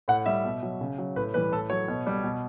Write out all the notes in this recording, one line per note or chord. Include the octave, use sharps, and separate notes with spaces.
A2 F#5
G3 E5
B2
F#3
C#3
F#3
A2 B4
E3 G3 B4
A2 A4
F#3 C#5
B2
G3
B2